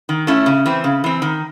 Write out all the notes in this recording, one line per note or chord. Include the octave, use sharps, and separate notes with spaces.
D#3
A3 C#4 E4
C#3
E3 C4
C#3
E3 C4
D#3